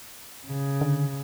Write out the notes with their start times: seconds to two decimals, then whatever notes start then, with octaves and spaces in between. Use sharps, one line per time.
0.47 C#3
0.81 D3